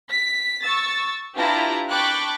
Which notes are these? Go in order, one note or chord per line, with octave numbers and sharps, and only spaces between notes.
B6
C#6 E6 A6
D4 E4 F4 G4 B4 A#5
G5 A5 B5 C#6 D6 F#6